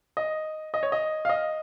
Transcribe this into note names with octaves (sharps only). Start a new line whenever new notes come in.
D#5
D#5
C#5
D#5
F5
D#5